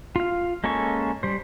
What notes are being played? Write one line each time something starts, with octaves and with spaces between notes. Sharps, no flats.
F4 F5
G#3 A#3 C#4 A4 C#6
G3 C5